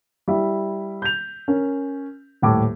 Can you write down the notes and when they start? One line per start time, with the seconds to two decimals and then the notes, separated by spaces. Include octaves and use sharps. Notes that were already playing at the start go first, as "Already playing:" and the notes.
0.28 G3 E4
1.02 G6 F7
1.48 C#4 A#4
2.42 D#1 A2 A5 D6